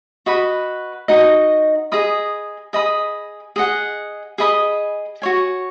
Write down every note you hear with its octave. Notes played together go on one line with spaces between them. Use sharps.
F#4 B4 D#5 B5
D#4 F#4 D#5
G#4 D#5 B5 D#6
G#4 D#5 B5 D#6
G#4 D#5 F#5
G#4 D#5 B5 D#6
F#4 C#5 G#5